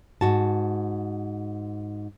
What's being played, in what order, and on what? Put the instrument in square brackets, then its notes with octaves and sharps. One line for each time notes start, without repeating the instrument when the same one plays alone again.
[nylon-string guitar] G#2 F#4 A5